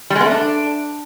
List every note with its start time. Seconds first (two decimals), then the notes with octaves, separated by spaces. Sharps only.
0.10 G3
0.16 G#3
0.21 B3
0.26 A3
0.31 D4